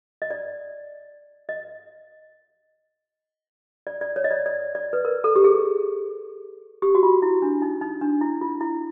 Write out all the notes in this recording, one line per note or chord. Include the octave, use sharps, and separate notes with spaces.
D#5
D5
D#5
D5
D5
C#5
D#5
D5
D5
D5
B4
A#4
A4
G4
G#4
G4
F#4
F4
E4
D4
D#4
D#4
D4
E4
F4
E4